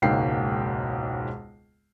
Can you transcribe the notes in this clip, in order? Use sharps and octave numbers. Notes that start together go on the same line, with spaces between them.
E1 C#2 G#2 A#3 G5 C7